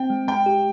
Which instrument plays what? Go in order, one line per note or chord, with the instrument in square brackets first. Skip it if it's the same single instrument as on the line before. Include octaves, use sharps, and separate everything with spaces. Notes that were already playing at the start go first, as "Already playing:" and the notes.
Already playing: [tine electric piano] C4 [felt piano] G5
[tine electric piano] G#3
[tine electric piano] G#3 [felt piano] G5
[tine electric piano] G4